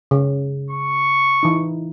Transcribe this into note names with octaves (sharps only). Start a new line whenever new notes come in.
C#3
C#6
E3 D#4